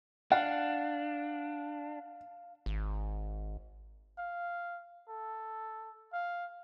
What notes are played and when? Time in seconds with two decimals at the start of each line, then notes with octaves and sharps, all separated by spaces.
0.32 D4 F5 F#5
2.66 G#1
4.18 F5
5.09 A4
6.13 F5